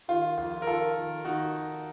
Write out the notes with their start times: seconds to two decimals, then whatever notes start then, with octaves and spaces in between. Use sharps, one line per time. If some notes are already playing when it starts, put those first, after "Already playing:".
0.08 D#3 F4
0.37 F2 F4
0.62 A#4
0.67 D#3 F4 A4
0.97 D#3
1.25 D#3 D#4 F#4